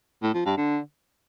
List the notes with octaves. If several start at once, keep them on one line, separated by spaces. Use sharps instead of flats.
A2
F3
G2
D3